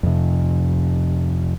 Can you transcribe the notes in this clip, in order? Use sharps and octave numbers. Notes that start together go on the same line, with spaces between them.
F2 C3